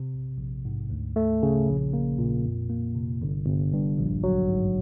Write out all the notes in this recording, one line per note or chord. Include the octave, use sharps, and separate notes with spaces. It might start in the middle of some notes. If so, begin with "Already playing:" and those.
Already playing: C3
A#1
A#1
G#2
D2
A3
C#3
A#1
A#3
A#2
F2
A#3
C3
G1
G1
G2
A#1
F#3
G#2